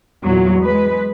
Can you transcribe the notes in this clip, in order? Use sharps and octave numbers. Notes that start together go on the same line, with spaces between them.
E2 A#2 F#3
G#3 B4